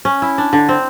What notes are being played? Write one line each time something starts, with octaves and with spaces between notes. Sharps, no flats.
C#4
E4
D4
D3
C4